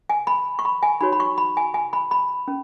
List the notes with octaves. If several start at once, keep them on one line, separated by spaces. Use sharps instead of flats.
G#5
B5
C#6
B5
G#5
D#4 F#4 C#5 B5
B5
C#6
B5
G#5
G#5
B5
B5
C#4